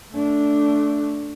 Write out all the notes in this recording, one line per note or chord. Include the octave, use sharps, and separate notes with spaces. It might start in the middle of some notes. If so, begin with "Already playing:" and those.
A3 D4